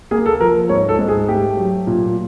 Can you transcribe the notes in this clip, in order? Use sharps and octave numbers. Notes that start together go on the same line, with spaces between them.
A#3 G#4
A4
F3 A#4
G#2 C#5
A4
G#2
G#4
A3 G4
F#3
A#2